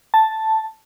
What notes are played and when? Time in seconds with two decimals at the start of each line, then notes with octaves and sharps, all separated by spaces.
0.14 A5